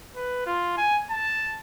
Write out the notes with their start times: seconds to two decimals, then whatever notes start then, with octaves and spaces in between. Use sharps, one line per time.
0.16 B4
0.47 F4
0.78 G#5
1.11 A5